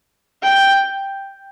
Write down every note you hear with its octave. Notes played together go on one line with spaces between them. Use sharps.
G5